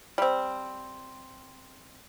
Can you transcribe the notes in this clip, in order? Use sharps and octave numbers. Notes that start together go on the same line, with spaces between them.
G3 C4